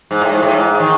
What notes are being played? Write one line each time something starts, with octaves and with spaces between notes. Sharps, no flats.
G#2
A2
G#2
A2
G#2
D#3